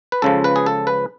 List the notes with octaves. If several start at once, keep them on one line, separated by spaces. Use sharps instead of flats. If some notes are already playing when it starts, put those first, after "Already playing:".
B4
C#2 C#3 F3 A4
B4
G#4
A4
B4